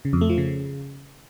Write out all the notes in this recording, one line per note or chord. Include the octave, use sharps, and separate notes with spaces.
C#3
F2
A3
F3
C#3